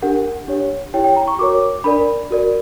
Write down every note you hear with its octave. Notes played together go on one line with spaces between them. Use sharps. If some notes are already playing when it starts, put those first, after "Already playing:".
D4 G4 A#4 F#5
D4 G4 C#5
E4 G4 C#5 G5
G5
A#5
C#6
F#4 A#4 C#5 D6
D4 A#4 D5 B5
F#4 A#4 D5